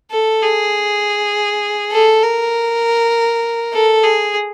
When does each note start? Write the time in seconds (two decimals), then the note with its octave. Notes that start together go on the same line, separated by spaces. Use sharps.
0.11 A4
0.41 G#4
1.92 A4
2.23 A#4
3.74 A4
4.04 G#4